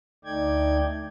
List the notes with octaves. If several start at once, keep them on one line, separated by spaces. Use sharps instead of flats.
D2 A3 D#4 D5 G5 G#6